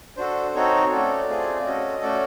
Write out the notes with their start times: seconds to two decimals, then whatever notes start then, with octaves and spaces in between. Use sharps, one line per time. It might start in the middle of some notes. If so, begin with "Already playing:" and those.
0.17 D4 F#4 A4 C5
0.55 C4 D#4 F#4 A4 C#5
0.92 A3 C#4 F#4 A4 D5
1.28 A3 C4 F4 G#4
1.65 C#4 F#4 A4 D#5
2.01 A3 C#4 F#4 A4 D5